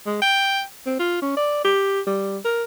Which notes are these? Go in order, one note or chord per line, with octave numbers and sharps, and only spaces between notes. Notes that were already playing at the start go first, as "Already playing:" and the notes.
G#3
G5
C4
F4
C#4
D5
G4
G3
A#4